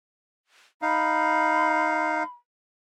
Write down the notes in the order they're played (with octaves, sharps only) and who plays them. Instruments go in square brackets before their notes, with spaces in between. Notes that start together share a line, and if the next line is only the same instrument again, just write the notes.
[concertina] D#4 F5 [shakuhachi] B5